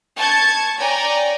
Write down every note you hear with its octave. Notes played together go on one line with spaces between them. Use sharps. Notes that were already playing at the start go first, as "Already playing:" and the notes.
A5 C#6 G#6
C#5 D5 G5 G#5 A#5